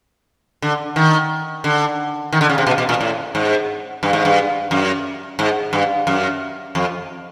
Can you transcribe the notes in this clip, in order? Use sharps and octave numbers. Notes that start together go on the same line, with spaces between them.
D3
D#3
D3
D#3
D3
C#3
C3
B2
B2
A#2
A2
G#2
G2
G#2
G2
F#2
G#2
G2
F#2
F2